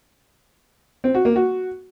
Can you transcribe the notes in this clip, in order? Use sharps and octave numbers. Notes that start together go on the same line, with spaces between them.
C4
F#4
A#3
F#4